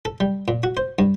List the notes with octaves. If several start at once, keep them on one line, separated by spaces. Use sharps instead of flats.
A4
G3
A#2
F#4
C5
G2